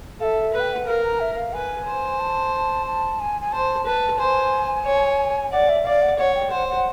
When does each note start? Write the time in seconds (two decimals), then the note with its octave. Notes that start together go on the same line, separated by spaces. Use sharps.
0.20 A4 F5
0.24 E5
0.53 B4
0.60 G5
0.73 F#5
0.87 A#4 F5
1.04 A#5
1.20 E5
1.37 F5
1.53 B4 G#5
1.86 C5
2.20 A5
2.87 A5
3.20 G#5
3.42 G#5
3.52 C5 A5
3.86 B4 A5
4.19 C5 G#5
4.86 C#5
5.52 D5 F#5
5.69 E5
5.85 D5 F5
6.02 F#5
6.18 C#5 F#5
6.35 G5
6.51 C5 F#5
6.68 F#5